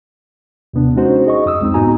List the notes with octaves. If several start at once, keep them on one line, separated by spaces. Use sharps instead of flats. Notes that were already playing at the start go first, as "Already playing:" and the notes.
D#2 C3 B3 D4
G#3 C#4 D#4 F#4 C5
G#4 D#5 C#6
F2 D#6 E6
C#2 G#3 C4 D#4
G#2 B3 D#4 F#4 G#5 A#5